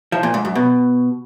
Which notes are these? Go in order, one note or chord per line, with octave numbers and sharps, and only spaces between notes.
F3
A#2
G#2
F#2
B2